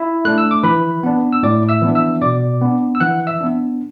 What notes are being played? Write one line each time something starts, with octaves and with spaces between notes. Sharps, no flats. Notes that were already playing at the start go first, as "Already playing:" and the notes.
Already playing: E4 E5
A3 D4 F#6
E6
D6
E3 B4 B5
B3 D4
E6
A2 D5 D6
E5 E6
E3 B3 D4
E5 E6
B2 D5 D6
B3 D4
E6
E3 F#5 F#6
E5 E6
B3 D4